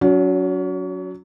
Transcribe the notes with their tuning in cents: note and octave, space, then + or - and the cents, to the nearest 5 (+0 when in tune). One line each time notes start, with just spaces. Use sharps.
F#3 -5 C#4 +35